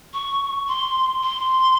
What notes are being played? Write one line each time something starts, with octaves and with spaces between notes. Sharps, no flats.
C#6
C6
C6